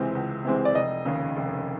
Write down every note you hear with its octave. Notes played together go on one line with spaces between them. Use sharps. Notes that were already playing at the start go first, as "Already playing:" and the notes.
Already playing: C#2 C3 E3 G#3 C4
C#2
C3 E3 G#3 C4
D5
F1 D#5
D#2 C#3
F1